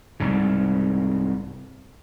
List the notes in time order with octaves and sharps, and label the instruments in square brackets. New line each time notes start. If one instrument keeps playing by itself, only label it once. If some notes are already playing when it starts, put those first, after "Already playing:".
[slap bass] C2 G#2 C#3